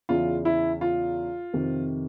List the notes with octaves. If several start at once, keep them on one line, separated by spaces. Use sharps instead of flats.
E2 C#3 E3 F4
E4
F4
F2 C3 D#3